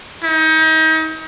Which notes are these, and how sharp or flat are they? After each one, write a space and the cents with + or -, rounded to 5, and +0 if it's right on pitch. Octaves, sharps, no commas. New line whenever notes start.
D#4 +35